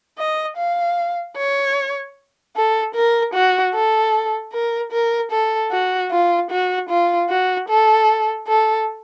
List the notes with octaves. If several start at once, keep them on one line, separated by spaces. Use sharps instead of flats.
D#5
F5
C#5
A4
A#4
F#4
A4
A#4
A#4
A4
F#4
F4
F#4
F4
F#4
A4
A4